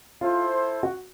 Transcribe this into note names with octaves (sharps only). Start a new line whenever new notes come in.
E4 F4 A4 C5
F#4